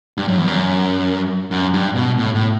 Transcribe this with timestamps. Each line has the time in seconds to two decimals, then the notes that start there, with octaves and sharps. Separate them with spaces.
0.18 G2
0.28 F#2
0.38 E2
0.48 F#2
1.51 F#2
1.74 G2
1.96 B2
2.18 A2
2.35 A2